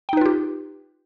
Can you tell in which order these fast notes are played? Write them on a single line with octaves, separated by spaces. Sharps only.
G5 D#4 B4 F4 G4